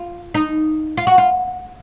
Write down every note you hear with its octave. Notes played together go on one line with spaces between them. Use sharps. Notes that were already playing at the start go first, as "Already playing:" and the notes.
Already playing: F4
D#4
F4
F#4
F4